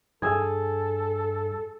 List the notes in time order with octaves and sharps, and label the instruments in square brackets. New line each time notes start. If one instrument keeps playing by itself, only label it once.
[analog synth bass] G2 [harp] G#4 G#5 E6 [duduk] A4